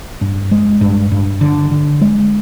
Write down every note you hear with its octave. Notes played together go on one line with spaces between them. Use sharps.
G2
G#3
G2
G2
D3
D3
G#3